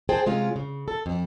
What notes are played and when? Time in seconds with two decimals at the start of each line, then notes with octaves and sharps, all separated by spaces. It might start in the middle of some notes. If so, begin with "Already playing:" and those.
0.09 G#4 C5 G5 A5
0.26 C3 G#3 C#4 F4
0.56 C#3
0.88 A4
1.06 F2